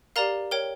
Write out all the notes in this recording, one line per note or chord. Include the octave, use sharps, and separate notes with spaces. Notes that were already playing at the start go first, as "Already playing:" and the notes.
G4 A#4 D5 F5 A#5
A#4 C#5 G5